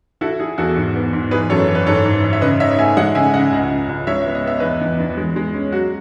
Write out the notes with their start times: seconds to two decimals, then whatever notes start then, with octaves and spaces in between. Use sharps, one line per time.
0.21 E4 F#4 A4
0.40 E4 G#4
0.58 E2 F#4 A4
0.77 G#2
0.95 B3
1.13 G#2
1.31 E3 G#4 B4
1.50 F#2 A4 C#5
1.68 E3
1.75 B4
1.86 G#2 A4 C#5
2.05 G#2
2.24 G#2
2.33 E5
2.41 C#3 B4 D#5
2.60 D#4 C#5 E5
2.78 A3 E5 G#5
2.97 G#3 D#5 F#5
3.15 C#3 E5 G#5
3.33 C#3 D#5 F#5
3.52 C#2
3.70 C#3
3.89 C#2
4.07 G#3 C#5 E5
4.25 B3
4.35 D#5
4.44 B3 E5
4.60 E2 B4 D#5
4.81 E2
4.99 E2
5.17 G#3
5.36 G#3
5.54 C#4
5.72 F#3 F#4